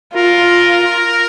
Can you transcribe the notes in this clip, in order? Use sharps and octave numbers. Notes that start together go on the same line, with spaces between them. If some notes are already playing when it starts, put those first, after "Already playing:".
F4 A#4